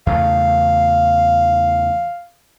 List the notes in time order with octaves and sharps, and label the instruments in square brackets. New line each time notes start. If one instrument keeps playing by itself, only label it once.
[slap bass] E2 C#3 A3 [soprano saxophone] F5